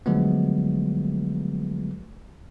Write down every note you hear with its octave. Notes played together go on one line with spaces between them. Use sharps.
D3 F3 F#3 G#3 A3 B3